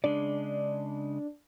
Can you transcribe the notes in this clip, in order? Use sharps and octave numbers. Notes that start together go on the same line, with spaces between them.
C#3 G#3 D4 D5